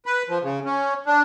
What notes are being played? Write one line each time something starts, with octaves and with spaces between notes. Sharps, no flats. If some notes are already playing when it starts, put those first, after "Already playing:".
B4
F3
C#3
C#4
D4